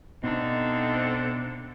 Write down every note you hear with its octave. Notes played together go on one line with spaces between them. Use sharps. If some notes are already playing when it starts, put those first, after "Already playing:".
B2 D3 A3 C4 D4 D#4